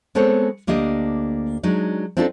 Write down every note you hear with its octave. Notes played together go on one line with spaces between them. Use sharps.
G#3 B3 C4 A4 C5 C#5
D2 A#3 D4 G4 D#5
F#3 G#3 D4 D#4
C4 D4 D#4 F4 F#4 A4